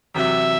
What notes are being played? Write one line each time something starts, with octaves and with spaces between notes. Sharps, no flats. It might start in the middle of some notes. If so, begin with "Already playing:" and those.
E2 C3 F#3 E5